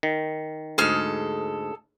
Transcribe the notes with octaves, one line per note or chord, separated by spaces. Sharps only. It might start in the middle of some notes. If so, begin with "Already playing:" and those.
D#3
D2 G#2 G#4 A4 F6